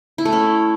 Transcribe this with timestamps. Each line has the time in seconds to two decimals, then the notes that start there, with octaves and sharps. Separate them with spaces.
0.18 E4
0.25 A3
0.32 C#4